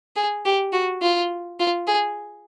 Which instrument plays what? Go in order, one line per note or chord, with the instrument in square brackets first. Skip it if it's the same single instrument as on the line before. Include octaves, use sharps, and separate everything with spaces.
[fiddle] G#4
G4
F#4
F4
F4
G#4